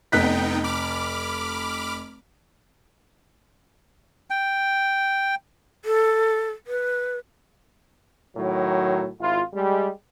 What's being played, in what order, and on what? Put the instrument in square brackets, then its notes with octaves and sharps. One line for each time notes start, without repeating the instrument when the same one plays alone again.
[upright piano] F1 F#6 B6 [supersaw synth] B3 D#4 G5
[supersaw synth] B5 D6 F6
[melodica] G5
[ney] A4
B4
[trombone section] A2 D#3 F#3
G#1 E4 F4
G3 G#3